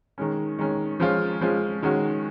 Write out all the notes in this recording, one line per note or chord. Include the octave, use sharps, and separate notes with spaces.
D#3 G#3 C#4
D#3 G#3 C#4
F3 G#3 C#4 F4
F3 G#3 C#4 F4
D#3 G#3 C#4 F#4